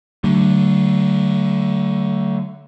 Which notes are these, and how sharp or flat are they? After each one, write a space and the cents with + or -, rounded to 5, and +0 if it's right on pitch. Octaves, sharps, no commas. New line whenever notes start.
D3 +0 F#3 +40 A3 +20